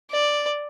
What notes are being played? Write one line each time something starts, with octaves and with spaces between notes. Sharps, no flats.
D5